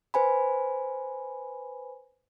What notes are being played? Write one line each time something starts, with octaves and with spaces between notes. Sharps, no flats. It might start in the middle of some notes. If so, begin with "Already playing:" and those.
B4 C5 G#5 B5